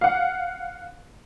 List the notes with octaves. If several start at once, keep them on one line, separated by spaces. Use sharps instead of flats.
F5 F#5